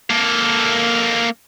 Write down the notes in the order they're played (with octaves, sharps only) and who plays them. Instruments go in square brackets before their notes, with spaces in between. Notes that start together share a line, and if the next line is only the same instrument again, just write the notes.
[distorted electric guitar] A#3 A4